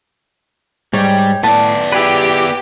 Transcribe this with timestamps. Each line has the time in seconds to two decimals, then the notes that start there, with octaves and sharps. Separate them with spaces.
0.93 G#2 G3 C#5 G5
1.43 A2 B3 D5 A5
1.92 E4 G4 G#4 B4